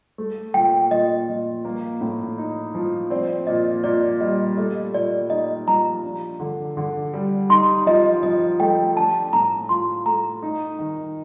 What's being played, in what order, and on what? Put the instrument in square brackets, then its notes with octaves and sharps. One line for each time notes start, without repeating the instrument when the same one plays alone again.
[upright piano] A3
[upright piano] A#2 [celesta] G5
[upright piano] A#2 [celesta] D#5
[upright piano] F3
A#3
A2
D#4
F3
[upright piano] C4 [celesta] D5
[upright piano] A#2 [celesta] D#5
[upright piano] A#2 [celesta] D5
[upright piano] G3 [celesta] D#5
[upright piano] A3 [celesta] D#5
[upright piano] A#2 [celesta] D5
[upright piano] D#4 [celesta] D#5
[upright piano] F3 [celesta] A#5
[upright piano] D4
D3
D3
G3
[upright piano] D#4 [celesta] C6
[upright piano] F3 [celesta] D#5
[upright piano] F3 [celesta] D#5
[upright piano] A3 [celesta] G5
[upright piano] D4 [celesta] A5
[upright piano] A2 [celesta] A#5
[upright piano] F4 [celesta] C6
[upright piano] A3 [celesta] A#5
[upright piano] D#4
D#3